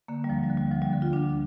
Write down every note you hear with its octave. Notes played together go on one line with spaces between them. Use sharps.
D3 A#3
G3
D2 F3
G3
D3
G3
D2 F3
G3
D3
F4
D2 D4